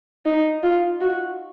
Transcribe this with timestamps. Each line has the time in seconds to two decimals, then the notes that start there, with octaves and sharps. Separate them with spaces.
0.26 D#4
0.63 F4
1.01 F#4